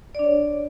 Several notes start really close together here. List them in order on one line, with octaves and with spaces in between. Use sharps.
D5 D4 C#5